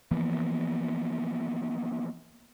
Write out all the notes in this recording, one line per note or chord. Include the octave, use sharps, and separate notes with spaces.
E3 F3 A#3 B3